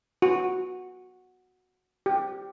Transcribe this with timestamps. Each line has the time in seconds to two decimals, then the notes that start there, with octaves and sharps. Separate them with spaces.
0.22 F#4
2.06 G4